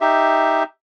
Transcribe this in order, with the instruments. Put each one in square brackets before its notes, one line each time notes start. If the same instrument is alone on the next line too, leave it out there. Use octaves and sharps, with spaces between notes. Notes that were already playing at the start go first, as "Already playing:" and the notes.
[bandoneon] D#4 G4 E5